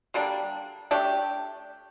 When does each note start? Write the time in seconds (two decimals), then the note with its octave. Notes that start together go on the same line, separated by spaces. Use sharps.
0.14 D3 G3 A#3 D4
0.91 A3 D4 G4